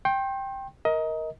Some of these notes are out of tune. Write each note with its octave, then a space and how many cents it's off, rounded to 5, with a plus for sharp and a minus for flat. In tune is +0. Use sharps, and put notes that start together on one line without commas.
G5 +0 C6 +40
A#4 +5 D#5 +25